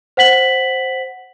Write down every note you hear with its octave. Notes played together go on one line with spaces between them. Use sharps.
C5 F#5 B6 F#7